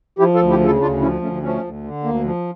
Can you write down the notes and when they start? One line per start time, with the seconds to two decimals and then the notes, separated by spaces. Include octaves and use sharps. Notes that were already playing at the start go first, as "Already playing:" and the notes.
0.19 F3 E4 G4
0.34 F4 A4
0.40 D2
0.50 E4 G4
0.60 C#3
0.66 F4 A4
0.80 D2 D4 F4
1.01 F3 C#4 E4
1.22 D2 A3 C#4
1.42 F3 A3 C#4
1.62 D2
1.83 D3
2.04 D2 A#3
2.24 F3